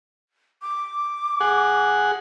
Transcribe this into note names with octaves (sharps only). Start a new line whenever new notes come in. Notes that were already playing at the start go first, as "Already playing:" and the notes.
D6
G#4 F#5